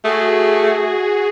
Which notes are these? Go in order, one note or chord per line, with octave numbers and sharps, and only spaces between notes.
A3 F#4 G#4